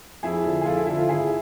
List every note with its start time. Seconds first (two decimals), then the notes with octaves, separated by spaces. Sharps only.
0.23 F2 E4 G#4
0.44 D3 F3
0.61 G#4
0.65 F2 F4 A4
0.76 E4
0.87 D3 F3 E4
0.98 F4
1.09 G#1 E4 G#4